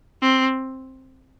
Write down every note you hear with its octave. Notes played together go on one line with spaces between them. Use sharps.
C4